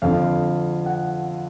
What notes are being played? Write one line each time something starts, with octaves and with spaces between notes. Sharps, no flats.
F2 D3 F5
F#5